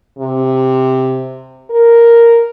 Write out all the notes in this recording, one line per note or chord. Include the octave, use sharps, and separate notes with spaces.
C3
A#4